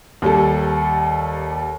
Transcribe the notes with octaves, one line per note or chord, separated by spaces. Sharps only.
D#2 G3 A4